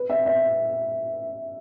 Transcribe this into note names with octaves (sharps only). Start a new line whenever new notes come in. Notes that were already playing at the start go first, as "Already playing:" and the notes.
Already playing: B4
E5
E5